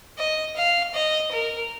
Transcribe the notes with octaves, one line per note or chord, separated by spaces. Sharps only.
D#5
F5
D#5
A#4